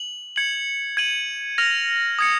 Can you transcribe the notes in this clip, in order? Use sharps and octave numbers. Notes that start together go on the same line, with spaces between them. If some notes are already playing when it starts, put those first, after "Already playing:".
Already playing: F#7
G#6 C#7 F#7
G#6 D#7 F#7
F6 A#6 F7
D#6 G#6 C#7